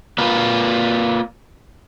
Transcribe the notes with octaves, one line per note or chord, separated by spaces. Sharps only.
A#3 F4 B4